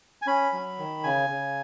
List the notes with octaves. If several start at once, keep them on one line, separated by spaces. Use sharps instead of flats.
G#5
C#4 B5
F#3
D#3
C#3 G#5
C#3